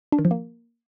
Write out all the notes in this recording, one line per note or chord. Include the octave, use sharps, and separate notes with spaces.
D4
D#3
F3
A#3